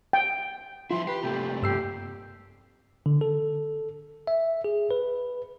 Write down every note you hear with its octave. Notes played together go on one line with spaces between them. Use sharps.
G5
F3 E4 F4 C6
G4 B4 B6 C7
C3 A3 A#3 G4
G2 G4 E6 C7
D3
A4
E5
G#4
B4